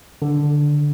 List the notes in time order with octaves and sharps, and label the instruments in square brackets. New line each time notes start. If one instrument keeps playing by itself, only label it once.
[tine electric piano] D3